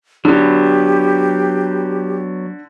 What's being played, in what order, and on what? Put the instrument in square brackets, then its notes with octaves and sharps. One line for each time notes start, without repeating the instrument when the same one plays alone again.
[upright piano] D3 [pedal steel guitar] F#3 B3 [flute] G4